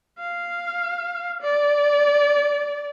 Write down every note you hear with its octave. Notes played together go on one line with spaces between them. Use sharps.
F5
D5